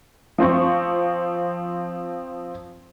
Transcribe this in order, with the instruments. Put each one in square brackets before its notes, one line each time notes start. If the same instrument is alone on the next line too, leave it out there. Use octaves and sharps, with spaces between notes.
[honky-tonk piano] F3 C4 C5 C#6